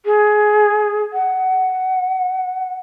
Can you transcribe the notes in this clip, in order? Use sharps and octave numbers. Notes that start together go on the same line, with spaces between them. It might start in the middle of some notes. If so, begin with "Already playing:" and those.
G#4
F#5